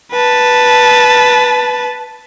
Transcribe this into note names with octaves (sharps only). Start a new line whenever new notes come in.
B4 A5